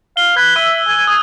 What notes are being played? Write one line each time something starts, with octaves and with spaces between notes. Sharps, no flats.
F5 G7
B4 F#6 G#6
E5 E6 D#7
G#5
D#6